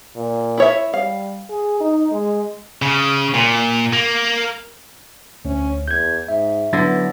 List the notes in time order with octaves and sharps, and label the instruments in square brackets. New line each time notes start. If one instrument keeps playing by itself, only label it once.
[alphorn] A#2
[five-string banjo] E4 C#5 E5
[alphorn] G3 [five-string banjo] F5
[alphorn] G#4
D#4
G#3
[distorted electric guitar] C#3
A#2
A#3
[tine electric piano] D2 [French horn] C#4
[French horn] E2 [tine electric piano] G6 G#6
[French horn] G#2 [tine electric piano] E5
[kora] D3 E4 [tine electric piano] F#3 A6 A#6 [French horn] B3